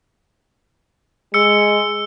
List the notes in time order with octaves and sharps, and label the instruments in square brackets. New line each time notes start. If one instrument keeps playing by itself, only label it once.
[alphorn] G#3 [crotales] E6 C#7